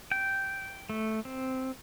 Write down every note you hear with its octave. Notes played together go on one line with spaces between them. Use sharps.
G5
A3
C4